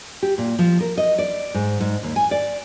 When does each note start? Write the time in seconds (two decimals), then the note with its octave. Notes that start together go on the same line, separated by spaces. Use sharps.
0.22 G4
0.38 A#2
0.59 F3
0.80 A#4
0.97 D#5
1.19 D5
1.54 G#2
1.80 G#2
2.03 D#2
2.16 G#5
2.31 D5